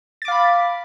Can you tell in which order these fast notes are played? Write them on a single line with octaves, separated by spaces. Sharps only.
A6 D6 F5 B5